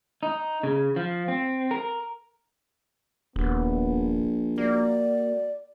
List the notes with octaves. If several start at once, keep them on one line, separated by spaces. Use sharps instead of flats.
D#4
C#3
F3
C4
A#4
D#1 A#1 B3
A#3 F#4 D5